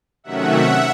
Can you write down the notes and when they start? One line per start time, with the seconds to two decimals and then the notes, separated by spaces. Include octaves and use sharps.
0.24 C3 D#3 F#3 A3 C#4 E5 F#5